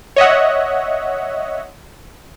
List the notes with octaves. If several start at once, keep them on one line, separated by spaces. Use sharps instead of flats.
C#5 D#5 E5 F#5